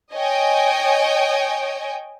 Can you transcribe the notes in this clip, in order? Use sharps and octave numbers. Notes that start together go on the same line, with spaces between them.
C#5 D#5 G5 G#5